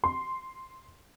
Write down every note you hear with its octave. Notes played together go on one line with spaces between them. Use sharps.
C6